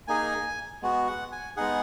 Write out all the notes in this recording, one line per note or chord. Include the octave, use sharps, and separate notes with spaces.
A#3 D#4 G#4 G#5
G#3 B3 F#4
F#5
G#5
G#3 B3 D#4 G#4 F#5